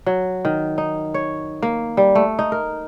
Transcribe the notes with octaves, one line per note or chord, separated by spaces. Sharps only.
F#3
D#3
D#4
C#5
A#3
G3
A3
D#4
A#4